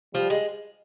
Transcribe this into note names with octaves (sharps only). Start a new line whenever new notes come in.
F3 G3
G#3